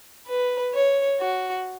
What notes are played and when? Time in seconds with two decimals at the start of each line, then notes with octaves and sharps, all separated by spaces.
0.28 B4
0.74 C#5
1.20 F#4